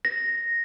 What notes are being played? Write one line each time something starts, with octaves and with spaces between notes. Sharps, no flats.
A#6